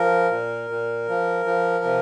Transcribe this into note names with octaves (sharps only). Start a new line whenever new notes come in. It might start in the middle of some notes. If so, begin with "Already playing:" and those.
Already playing: F3 A#4
A#2
A#2
F3
F3
C3